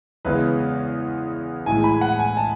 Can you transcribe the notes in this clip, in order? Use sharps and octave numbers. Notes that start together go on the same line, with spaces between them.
E2 C#3 G#3 B3 B4
A2 E3 G#3 G#5
B5
F#5
G#5
A5